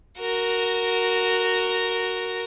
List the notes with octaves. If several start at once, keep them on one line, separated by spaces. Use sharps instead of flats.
F#4 A#4